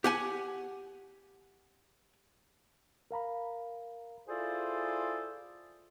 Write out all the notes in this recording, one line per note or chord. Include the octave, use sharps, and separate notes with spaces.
G4 F#5 G#5
A#4 F5 A#5 B5
E4 F4 G#4 A4 C5 D5